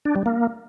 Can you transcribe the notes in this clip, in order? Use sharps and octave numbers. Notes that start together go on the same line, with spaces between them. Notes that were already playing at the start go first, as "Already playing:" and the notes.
D4
G3
A#3